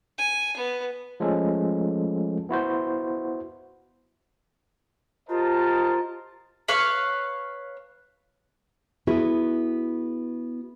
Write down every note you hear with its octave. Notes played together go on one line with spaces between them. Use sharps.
G#5
B3
F3 G#3 A3 C#4 A4
B3 E4 F#4 C5
F4 G4 A#4 C5 D#5 A5
B4 C#5 F5 C#6
B3 E4 F#4 G#4